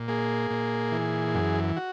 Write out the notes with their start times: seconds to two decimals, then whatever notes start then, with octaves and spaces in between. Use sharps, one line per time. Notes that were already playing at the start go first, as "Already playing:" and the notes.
Already playing: A#2
0.08 A#3 G#4
0.50 A#2
0.92 E3
1.35 F#2
1.76 F#4